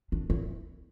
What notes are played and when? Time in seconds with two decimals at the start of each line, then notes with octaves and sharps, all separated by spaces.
0.12 D4
0.30 E4